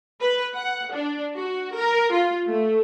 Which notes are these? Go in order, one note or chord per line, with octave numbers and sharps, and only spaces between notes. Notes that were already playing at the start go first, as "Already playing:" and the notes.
B4
F#5
D4
F#4
A#4
F4
A3